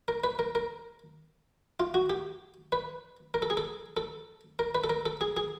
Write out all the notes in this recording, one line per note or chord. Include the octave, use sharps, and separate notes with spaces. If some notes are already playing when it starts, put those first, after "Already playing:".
A#4
B4
A#4
A#4
F4
F#4
G4
B4
A#4
A4
G#4
A4
A4
A#4
B4
A4
A#4
A4
G#4
G#4